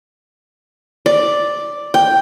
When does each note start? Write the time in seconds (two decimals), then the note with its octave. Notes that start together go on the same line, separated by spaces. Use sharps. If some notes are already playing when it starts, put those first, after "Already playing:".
1.06 D5
1.94 G5